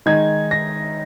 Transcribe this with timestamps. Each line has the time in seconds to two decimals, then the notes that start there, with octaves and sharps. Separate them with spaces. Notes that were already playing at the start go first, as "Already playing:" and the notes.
0.06 D#3 G#3 D#4 G#6
0.51 A#6